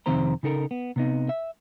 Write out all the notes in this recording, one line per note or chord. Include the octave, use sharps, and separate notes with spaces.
F2 C3 D#3 C4 C5 A#5
C#3 D#4 A4 A#4
B3
C3 B3 D#4
E5